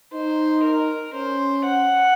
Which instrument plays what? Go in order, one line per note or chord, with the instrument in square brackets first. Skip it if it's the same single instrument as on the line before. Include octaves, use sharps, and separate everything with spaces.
[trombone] D#4 [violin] C5
[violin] A#4
[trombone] C#4 [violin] C5
[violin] F#5